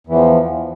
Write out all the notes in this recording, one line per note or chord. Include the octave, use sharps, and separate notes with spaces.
E2 E3 F3